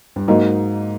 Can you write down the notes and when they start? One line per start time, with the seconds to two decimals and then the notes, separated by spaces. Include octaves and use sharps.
0.16 G2
0.28 G#2 F#3 A#3 D#4